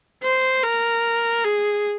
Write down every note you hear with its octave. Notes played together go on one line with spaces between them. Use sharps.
C5
A#4
G#4